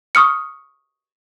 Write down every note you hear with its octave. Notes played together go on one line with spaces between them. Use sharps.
C#6 D#6 F6 C#7